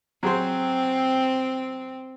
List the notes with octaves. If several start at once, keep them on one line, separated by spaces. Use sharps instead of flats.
F#3 C4 G#4 C5